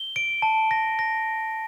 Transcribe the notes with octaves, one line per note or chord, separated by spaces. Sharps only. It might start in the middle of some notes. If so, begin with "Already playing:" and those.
Already playing: G7
D7
A5
A#6
A#6